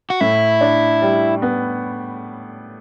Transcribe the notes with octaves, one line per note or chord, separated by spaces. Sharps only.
F#4
A2 E4
D4
G3
B3